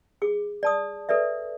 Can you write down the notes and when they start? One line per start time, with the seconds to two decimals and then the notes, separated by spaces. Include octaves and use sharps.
0.22 G#4 D6
0.63 D5 A5 D#6
1.09 A4 B4 D5 E5